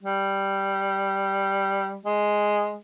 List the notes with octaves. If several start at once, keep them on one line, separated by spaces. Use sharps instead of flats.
G3
G#3